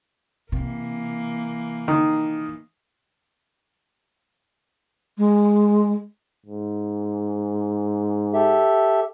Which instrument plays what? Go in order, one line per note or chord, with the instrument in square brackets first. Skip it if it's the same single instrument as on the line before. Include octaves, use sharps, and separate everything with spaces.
[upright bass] C3 [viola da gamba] E3 A#3
[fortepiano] D#3
[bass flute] G#3
[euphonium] G#2
[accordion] G4 A4 E5